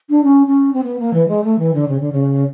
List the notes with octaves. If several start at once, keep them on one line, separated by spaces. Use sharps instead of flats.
D4
C#4
C#4
C4
B3
A#3
E3
G#3
A3
E3
D3
C#3
D3
C#3